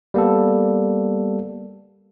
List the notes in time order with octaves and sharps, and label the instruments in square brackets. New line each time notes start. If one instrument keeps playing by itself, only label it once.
[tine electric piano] G3 A#3 B3 A4